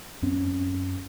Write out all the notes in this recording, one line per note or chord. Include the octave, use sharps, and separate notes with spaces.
F#2 C4 C#4